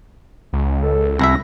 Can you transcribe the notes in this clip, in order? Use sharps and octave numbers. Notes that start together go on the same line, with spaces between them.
C#2
A4
C2 E4 E5 A#6